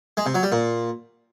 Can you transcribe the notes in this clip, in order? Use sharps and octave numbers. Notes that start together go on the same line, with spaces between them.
G#3
C3
F#3
G3
A#2